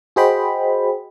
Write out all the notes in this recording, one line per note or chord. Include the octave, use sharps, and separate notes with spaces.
F#4 G#4 C5 D#5 G5 B5